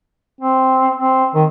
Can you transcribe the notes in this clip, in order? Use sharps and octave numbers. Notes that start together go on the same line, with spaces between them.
C4
C4
D#3